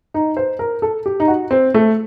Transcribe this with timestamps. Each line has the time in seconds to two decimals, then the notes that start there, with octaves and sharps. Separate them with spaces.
0.14 D#4
0.37 C5
0.59 A#4
0.82 A4
1.06 G4
1.20 D#4
1.28 F#4
1.51 C4
1.74 A3